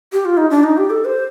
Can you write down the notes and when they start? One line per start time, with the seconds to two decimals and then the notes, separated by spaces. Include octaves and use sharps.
0.12 G4
0.25 F4
0.37 D#4
0.50 D4
0.64 D#4
0.77 G4
0.90 A4
1.05 C5